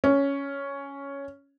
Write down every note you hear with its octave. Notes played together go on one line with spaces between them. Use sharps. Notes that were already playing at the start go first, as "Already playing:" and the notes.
C#4